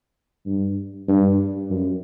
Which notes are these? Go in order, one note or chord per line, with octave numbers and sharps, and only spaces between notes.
G2
G2
F#2